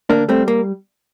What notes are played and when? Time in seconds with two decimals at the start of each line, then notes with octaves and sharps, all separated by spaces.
0.10 D2 A#3 D4
0.28 G3 A3 C4
0.48 A#3